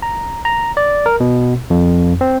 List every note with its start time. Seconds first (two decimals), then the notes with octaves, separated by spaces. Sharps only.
0.02 A#5
0.45 A#5
0.77 D5
1.06 A#4
1.20 B2
1.70 F2
2.21 C4